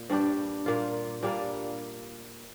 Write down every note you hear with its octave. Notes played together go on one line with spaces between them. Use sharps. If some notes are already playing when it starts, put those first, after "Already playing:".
Already playing: A#2
G2 G3 D4 G4
A#2 A#3 F4
A#2 G3 A#3 D4